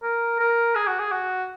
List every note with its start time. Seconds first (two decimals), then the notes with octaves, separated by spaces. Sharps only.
0.03 A#4
0.39 A#4
0.75 G#4
0.87 F#4
0.99 G#4
1.12 F#4